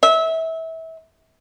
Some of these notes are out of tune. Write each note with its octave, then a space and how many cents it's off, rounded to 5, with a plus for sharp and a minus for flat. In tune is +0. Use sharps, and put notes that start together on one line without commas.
E5 -25